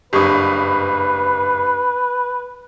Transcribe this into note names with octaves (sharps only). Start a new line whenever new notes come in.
F#1 G2 G4 B4 C#6 D#6